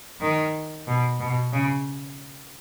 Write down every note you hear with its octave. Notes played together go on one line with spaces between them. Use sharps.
D#3
B2
B2
C#3